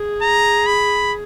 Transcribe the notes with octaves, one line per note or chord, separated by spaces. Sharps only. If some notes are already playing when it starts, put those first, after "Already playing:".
Already playing: G#4
A#5
B5